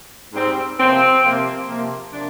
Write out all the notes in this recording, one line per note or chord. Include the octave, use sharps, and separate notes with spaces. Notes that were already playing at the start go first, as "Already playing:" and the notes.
G#2 G3 C4
C3 F3 A#3 C4
C3 F3 A#3
C3 F3 A#3
C3 F3 A#3 D4